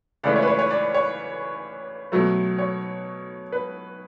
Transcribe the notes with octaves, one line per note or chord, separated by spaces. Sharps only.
C#2 C#3 E3 A3 D5
C#5
B4
C#5
C#5
D5
C#5
B2 F#3 A3
C#5
B4